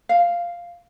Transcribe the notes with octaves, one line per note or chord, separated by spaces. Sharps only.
F5